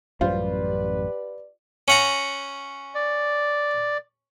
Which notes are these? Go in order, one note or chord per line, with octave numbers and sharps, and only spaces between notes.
A1 F#2 G3 F4 G4 B4 C5 D5
C#4 F#5 A#5
D5